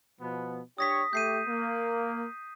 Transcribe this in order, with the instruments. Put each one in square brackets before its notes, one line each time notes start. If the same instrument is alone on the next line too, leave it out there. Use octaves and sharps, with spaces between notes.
[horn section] B2 F3 B3
[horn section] D4 G4 C#5 [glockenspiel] D#6 A#6 B6
[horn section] A3 G4 [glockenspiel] G6 C7 D#7
[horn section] A#3